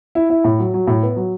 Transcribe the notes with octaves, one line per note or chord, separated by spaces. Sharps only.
E4
E4
A2
F#3
F#3
A2
B3
F#3